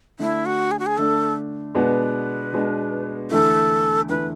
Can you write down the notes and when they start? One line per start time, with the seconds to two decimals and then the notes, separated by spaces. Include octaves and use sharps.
0.19 D3 A3 D4 E4
0.46 F#4
0.71 G#4
0.79 F#4
0.86 G#4
0.98 D3 A3 D4 A4
1.75 B2 G#3 B3 D4 B4
2.53 B2 G#3 B3 D4
3.31 E2 D3 A3 E4 A4
4.09 E2 D3 A3 E4 B4